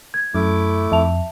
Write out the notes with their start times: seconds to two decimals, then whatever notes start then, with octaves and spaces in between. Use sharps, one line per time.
0.14 G#6
0.35 F#2 A3 E4 D6
0.92 F2 E5 A5 F7